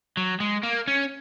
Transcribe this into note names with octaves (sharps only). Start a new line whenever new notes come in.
F#3
G#3
A#3
C#4